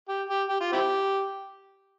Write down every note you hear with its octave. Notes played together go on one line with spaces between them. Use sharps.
G4
G4
G4
F4
C4 E4 G4